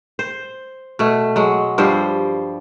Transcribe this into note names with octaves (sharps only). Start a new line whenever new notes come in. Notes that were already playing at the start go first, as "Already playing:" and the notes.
C5
B2 A3
F#3 G#3
G2 F3 G3 C5